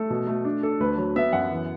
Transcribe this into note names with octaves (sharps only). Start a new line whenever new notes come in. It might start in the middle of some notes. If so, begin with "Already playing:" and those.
Already playing: A3 A4
B2
A3
D4
D4 A4
D2 B4
F#3
B3 E5
F#2 F#5
E3